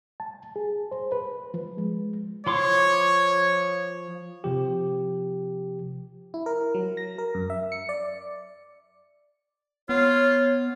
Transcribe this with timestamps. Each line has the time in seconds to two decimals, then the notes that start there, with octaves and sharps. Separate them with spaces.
0.20 A5
0.56 G#4
0.91 C5
1.12 B4
1.54 F3
1.77 G#3
2.47 F3 C#5 C6 D6
4.44 C3 F3 G4
6.34 E4
6.46 A#4
6.74 F#3
6.97 A#6
7.18 A#4
7.35 F#2
7.50 E5
7.72 C#7
7.89 D5
9.89 B3 F4 C#5